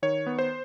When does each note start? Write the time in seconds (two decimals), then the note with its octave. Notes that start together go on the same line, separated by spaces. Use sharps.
0.02 D#3 C#5
0.26 B3
0.39 C5